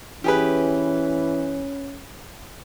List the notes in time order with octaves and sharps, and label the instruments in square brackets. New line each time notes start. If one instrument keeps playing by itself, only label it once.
[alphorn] E3 [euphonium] C#4 [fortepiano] G4 G#4 B4